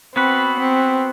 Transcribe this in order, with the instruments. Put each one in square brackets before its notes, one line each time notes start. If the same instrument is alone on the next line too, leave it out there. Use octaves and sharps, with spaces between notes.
[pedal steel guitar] B3 F#4 B4 [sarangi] C4
[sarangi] C4